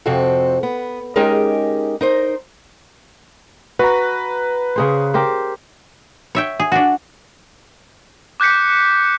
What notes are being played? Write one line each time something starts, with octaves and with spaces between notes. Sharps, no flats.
F2 C3 C4 F#4 A4
B3
G#3 C#4 D#4 G4 G#4 A#4
D#4 A#4 C5
F#4 B4 A#5
C#3 G#4 C5
G4 A#4 C5
C#5 E5 G5
G#4
D4 F#4
D6 F#6 G6 B6 C#7